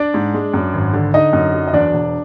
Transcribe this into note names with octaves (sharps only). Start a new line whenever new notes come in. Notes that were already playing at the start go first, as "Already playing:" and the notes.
Already playing: D4 D5
G#2
G#3
F#2
G#1
D3
D3 D#4 D#5
F#2
F#3
D#5
E2 D4 D5
E1